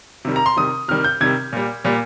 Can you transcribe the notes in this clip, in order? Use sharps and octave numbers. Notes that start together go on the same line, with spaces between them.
C3 D#3 G3
A#5
C6
C3 D#3 G3 D#6
C3 D#3 G3 F6
G6
C3 D#3 G3 G#6
A#2 G3
A#2 G3